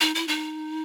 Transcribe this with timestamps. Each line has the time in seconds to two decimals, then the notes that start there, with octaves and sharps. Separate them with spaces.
0.01 D#4
0.15 E4
0.28 D#4